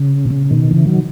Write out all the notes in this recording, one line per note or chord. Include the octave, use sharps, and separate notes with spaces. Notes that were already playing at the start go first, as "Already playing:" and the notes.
Already playing: C#3
B2
C#3
B2 D#3
C#3 E3
D#3 F#3